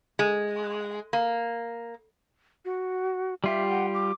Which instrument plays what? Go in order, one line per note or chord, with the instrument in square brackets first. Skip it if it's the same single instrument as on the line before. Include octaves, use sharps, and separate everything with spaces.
[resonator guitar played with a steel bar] G#3
A#3
[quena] F#4
[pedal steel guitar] G3 F4 G4 [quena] E5
[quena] F#5
D6